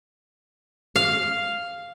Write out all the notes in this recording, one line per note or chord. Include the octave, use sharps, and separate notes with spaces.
F5